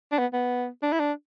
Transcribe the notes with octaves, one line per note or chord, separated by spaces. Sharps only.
D4
B3
B3
D4
E4
D4